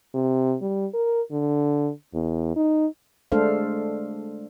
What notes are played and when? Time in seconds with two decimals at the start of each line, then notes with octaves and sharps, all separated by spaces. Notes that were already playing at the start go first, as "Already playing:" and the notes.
0.14 C3
0.61 G3
0.93 A#4
1.31 D3
2.14 E2
2.56 D#4
3.32 G#3 A3 D4 A4 C5 F5